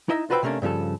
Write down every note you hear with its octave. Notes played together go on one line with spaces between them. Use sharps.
D#4 E4 D#5 E5
F4 F#4 B4 C5 E5 G5
C3 A3 A#3 C#4 D4
G2 C#3 F3 A4